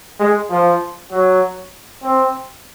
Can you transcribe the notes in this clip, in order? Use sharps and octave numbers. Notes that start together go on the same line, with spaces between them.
G#3
F3
F#3
C4